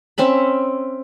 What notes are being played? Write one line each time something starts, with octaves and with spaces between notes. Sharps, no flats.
C4 C#4 E5 B5